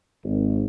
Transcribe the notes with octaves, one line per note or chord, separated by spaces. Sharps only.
G#1